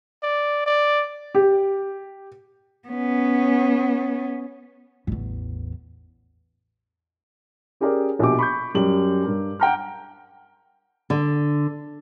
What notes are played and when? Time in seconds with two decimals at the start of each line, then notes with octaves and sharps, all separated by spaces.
0.23 D5
0.66 D5
1.35 G4
2.88 B3 C#4
5.07 A1 E2
7.81 C#4 G4 G#4 A#4 D5
8.19 A#1 B2 G4 D6
8.39 B5 C#6 G6
8.75 F#2 G3 G4 F#7
9.23 G2 A#4
9.60 F#5 G5 A#5 F6
11.10 D3